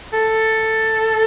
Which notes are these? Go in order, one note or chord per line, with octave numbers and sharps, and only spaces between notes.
A4